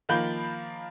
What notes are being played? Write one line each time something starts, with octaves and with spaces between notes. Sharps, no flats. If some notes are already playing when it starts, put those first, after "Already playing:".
D#3 F3 A#3 B5 G6